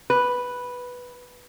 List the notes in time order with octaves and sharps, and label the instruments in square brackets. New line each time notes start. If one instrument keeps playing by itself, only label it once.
[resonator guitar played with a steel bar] B4